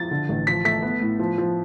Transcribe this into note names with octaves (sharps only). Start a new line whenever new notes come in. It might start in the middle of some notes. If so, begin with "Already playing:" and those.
Already playing: F3 A6
D3
A1
F3 B6
A3 B6
B3
A2
F3
F3